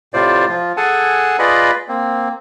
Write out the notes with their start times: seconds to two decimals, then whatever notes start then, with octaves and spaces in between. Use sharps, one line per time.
0.14 A2 C3 F4 C5 D5
0.49 F3 F4
0.77 G#4 A4 F#5 G#5 A5
1.39 F4 G#4 B4 D5 D#5 B5
1.88 A#3 C4